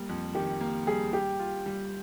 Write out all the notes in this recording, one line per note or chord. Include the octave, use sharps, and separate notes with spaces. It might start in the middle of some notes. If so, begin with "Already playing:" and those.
Already playing: G3 A#3
F2
D#3 G4
A#3
G3 G#4
G3 G4
F4
G3